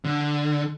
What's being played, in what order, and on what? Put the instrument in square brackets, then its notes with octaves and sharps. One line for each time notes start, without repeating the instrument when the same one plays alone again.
[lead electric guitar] D3